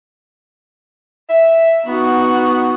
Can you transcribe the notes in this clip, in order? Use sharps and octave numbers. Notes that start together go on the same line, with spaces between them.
E5
B3 D#4 F#4